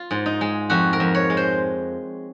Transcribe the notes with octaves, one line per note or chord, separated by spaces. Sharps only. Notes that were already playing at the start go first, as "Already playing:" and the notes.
Already playing: F4
G#2
D#4
G#3
F2 F#4
A#4
F2
C#5
G#3
C5